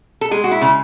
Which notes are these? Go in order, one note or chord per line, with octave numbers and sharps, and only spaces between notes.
A4
G#3 G#4
F#4
E4
C#3